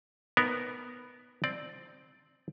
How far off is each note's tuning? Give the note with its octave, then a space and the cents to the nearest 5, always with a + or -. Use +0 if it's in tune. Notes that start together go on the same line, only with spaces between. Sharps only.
B3 +0 D#4 +0 A#4 +0
C4 +0 D5 +10